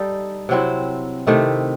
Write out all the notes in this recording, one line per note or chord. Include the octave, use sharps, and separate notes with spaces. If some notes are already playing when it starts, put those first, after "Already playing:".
Already playing: G3 D#4 A4
C3 F#3 C4 E4
C3 D#3 A3 E4